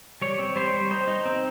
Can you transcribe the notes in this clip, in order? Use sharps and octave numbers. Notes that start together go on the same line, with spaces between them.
G3 C#5
C4
G3 C5
G3
D#4 C5
D#4
C4